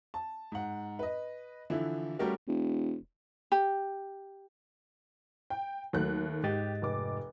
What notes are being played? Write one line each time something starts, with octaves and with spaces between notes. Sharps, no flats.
A5
G#2 F#5
B4 D#5
D3 E3 F3 E4
G3 A3 C#4 F#4 G4 A#4
E1
G4
G5
D#2 F#3 A3 F#6
G#2 G4 D#5 A6
F1 D6